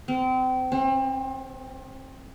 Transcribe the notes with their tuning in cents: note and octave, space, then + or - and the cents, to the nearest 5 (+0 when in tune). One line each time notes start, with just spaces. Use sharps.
C4 -30
C4 +35